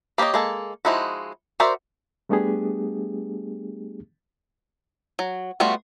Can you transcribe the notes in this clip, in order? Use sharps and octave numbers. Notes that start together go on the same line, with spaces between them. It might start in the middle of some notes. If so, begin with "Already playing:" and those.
A#3 G4 A#4 C#5 D#5
G#3 A#3 A4
F3 G#3 D#4 E4 F#4
F#4 A#4 C5 D5 E5
G3 A3 B3 D4 G4 G#4
F#3
G3 A3 B3 F4 F#4